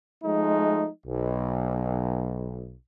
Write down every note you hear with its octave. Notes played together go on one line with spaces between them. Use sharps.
F3 G#3 A3 D#4
B1